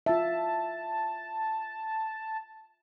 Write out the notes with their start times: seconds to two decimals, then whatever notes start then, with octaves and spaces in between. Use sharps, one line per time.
0.06 F4 E5 A5